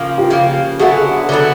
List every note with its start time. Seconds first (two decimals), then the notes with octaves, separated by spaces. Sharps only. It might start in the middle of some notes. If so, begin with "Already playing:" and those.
Already playing: C#3 F3 A#3
0.18 F4 G4
0.30 C#3 F3 A#3
0.79 D3 F#3 B3 E4 F#4 G#4
1.29 D3 F#3 B3 E4